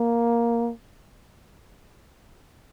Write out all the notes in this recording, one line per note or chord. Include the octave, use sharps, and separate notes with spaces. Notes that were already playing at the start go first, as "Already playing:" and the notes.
Already playing: A#3